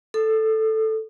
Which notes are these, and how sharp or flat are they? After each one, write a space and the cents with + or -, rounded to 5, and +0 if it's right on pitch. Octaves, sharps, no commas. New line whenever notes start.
A4 +0 D#6 -35